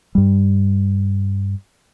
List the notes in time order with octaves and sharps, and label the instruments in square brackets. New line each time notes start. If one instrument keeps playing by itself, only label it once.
[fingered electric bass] G2 G3